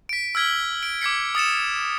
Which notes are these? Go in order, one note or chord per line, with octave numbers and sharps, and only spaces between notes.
B6 D7
E6 F6 G#6 B6 G7
D7
D6 G#6 B6 C#7
D#6 A6 C#7 E7